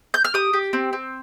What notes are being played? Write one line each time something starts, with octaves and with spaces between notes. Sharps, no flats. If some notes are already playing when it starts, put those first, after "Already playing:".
G6
F6
G4 D#6
G4
C4
C4